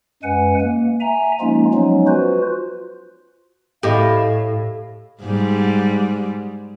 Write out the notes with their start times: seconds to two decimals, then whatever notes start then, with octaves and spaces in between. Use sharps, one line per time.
0.23 F#2 G#3 B4 F#5 G#5
0.61 A#3
1.00 E5 G#5 A#5
1.40 F3 G#3 A#3 C#4 D#4 F4
1.73 F3 F#3 G#3 B3 C#4 D#4
2.07 F4 F#4 B4 C5
3.83 A2 G4 D#5 F5
5.22 G#2 G3